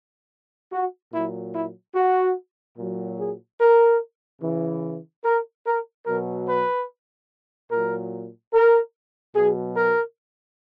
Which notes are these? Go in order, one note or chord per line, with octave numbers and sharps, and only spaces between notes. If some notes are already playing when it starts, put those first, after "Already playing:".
F#4
A#2 F#3 E4
E4
F#4
A#2 F#3
G#4
A#4
C#3 E3
A#4
A#4
B2 F#3 A#4
B4
A#2 F#3 A#4
A#4
B2 F#3 G#4
A#4